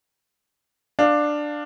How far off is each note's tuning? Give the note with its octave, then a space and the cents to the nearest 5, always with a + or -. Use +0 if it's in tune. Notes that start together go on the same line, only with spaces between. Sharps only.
D4 +10 F5 +5